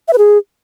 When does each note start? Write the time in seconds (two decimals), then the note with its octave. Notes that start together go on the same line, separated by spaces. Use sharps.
0.08 E5
0.13 B4
0.18 G#4